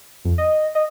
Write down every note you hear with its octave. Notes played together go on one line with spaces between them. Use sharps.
F2
D#5
D#5